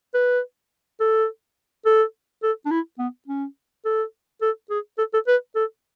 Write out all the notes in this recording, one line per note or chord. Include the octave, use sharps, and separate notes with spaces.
B4
A4
A4
A4
D4
E4
B3
C#4
A4
A4
G#4
A4
A4
B4
A4